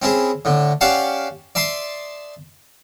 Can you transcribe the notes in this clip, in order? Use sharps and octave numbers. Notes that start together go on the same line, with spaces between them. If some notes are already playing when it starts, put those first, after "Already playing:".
C4 C#4 E4 G#4
A2 D3
C#4 G4 D5 F5 F#5 A5
D5 E5 A5 C6 D#6